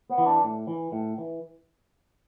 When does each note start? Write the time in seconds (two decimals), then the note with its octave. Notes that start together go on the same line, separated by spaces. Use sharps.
0.10 B3
0.18 E3
0.26 D4
0.44 A2
0.67 E3
0.92 A2
1.18 E3